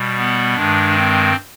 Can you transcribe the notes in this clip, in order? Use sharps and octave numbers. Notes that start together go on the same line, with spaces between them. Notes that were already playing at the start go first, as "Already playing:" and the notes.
Already playing: B2 G3
B3
G2 D#3 G#3 D4
C4